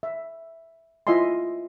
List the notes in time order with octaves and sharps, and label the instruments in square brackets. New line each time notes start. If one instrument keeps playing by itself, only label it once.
[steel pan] E5
E4 F4 D#5 E5 G#5 C6